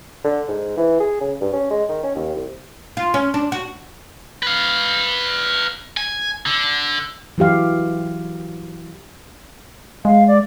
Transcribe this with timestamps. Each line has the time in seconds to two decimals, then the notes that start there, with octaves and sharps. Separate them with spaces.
0.24 D3
0.48 G#2
0.77 E3
1.00 G#4
1.20 C#3
1.41 G2
1.53 C#4
1.70 G#3
1.89 D#3
2.03 C#4
2.16 D#2
2.35 C2
2.97 F4
3.14 C#4
3.34 D4
3.52 F#4
4.43 B4 F5
5.97 G#5
6.46 D3
7.38 E3 F#3 G4 F5
10.05 G#3 F5
10.28 D5